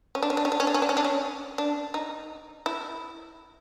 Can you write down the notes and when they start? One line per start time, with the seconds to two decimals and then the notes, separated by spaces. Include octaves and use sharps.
0.15 C#4
0.23 D4
0.30 C#4
0.37 D4
0.45 C#4
0.52 D4
0.60 C#4
0.67 D4
0.74 C#4
0.82 D4
0.89 C#4
0.97 D4
1.04 C#4
1.58 D4
1.94 D#4
2.66 E4